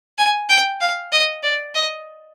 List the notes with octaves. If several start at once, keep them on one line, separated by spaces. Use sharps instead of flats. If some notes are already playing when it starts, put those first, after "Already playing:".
G#5
G5
F5
D#5
D5
D#5